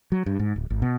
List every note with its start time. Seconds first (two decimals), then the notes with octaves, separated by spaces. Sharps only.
0.12 F#3
0.26 G2
0.39 G#2
0.56 D1
0.70 G#1
0.82 B2